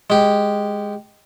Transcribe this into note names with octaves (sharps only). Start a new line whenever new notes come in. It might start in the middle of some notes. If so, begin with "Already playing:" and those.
G#3 G4